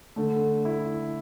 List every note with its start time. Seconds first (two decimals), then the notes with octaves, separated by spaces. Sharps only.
0.16 D3 A3
0.65 E4